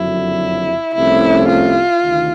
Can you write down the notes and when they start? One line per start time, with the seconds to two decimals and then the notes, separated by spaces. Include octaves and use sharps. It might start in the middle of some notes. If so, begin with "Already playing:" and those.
Already playing: F#1 F2 D3 F#3 E4
0.95 C2 C3 F3 A3 C#4 E4
1.48 F4
2.01 D2 C3 D#3